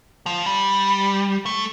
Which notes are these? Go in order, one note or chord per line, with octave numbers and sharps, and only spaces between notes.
F3
G3
A3